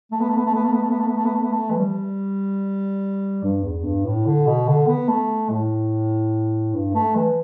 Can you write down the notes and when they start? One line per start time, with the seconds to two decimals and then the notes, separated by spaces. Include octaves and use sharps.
0.12 A3
0.20 B3
0.29 A3
0.37 B3
0.46 A3
0.55 B3
0.64 A3
0.73 B3
0.82 A3
0.90 B3
0.99 A3
1.08 B3
1.16 A3
1.25 B3
1.34 A3
1.42 B3
1.51 A3
1.70 E3
1.78 G3
3.43 G2
3.63 E2
3.84 G2
4.05 A2
4.26 D3
4.47 B2
4.68 D3
4.87 B3
5.08 A3
5.50 A2
6.74 G2
6.95 A3
7.15 E3